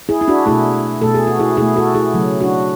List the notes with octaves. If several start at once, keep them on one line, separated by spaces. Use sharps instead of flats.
E4 G#4
E4
D4 F#4
B2 A3 E4 G#4
B2 A3 A4
G#4
F#4
E4 G#4
B2 A3 E4 G#4
F#4 A4
E4 G#4
C#3 F#3 A3
D4 F#4